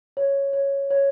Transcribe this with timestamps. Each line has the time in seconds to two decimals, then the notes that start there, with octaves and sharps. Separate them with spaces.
0.17 C#5
0.53 C#5
0.91 C#5